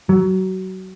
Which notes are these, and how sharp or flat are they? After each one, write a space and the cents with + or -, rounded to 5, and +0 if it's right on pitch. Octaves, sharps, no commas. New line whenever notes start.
F#3 +25